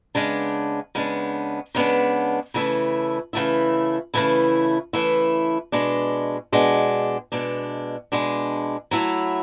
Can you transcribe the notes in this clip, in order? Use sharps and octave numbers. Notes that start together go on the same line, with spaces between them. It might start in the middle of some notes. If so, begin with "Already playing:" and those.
C#3 G#3 B3 D4
C#3 G#3 B3 D4
C#3 G#3 B3 D4
C#3 E3 A3 E4
C#3 E3 A3 E4
C#3 E3 A3 E4
C#3 E3 A3 E4
B2 G#3 D4
B2 G#3 D4
B2 G#3 D4
B2 G#3 D4
F#3 A3 E4